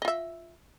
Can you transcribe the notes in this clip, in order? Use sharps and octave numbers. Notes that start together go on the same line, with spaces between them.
F4 D#5 E5